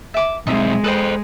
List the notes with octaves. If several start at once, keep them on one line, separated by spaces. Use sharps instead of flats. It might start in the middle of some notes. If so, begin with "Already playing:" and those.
E5 D6
B1 G#3 C4 D#4 E5
A4 B4 C5 D#5 G5